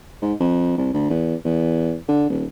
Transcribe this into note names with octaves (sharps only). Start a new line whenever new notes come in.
G#2
F2
C2
D2
E2
E2
D3
D#1